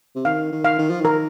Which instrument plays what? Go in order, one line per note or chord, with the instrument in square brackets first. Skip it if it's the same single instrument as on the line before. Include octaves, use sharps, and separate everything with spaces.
[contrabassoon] C3
[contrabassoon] D#3 [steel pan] F5
[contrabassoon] D#3
[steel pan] F5
[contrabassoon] D#3
F3
[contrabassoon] D#3 [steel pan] A#4